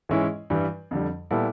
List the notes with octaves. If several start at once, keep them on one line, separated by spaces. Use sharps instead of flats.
G#2 E3 G#3 C#4 E4
G2 E3 G3
F2 D3 G3
A#2 G3 B3 E4 A4